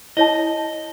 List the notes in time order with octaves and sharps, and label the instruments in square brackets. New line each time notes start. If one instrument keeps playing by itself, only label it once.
[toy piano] E4 C#5 A5 [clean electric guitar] D#5